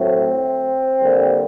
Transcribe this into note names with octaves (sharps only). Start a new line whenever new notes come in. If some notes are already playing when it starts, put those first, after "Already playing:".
Already playing: A2 F#3 A3 C4
D3 G3 A#3